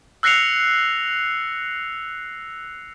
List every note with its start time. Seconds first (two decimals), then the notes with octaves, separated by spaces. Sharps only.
0.23 E6 F#6 A#6 C7 C#7 F7